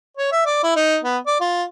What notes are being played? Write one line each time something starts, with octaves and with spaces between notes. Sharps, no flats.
C#5
E5
D5
E4
D#4
B3
D5
F4